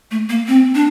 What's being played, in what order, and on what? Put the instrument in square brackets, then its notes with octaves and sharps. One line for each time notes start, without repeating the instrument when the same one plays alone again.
[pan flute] A3
A#3
C4
D4